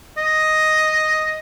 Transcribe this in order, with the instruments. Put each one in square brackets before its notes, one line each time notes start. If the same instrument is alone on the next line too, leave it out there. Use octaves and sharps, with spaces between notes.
[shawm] D#5